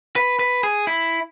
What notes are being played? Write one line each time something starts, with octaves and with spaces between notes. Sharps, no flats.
B4
B4
G#4
E4